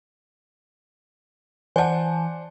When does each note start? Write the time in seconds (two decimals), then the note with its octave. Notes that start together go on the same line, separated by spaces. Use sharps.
1.76 E3 C5 D5 F#5 G#5 A5